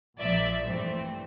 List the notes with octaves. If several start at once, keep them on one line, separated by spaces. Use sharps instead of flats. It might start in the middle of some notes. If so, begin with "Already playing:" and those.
A#1 A#2 F3 D5 E5
G2 E3 A3 C4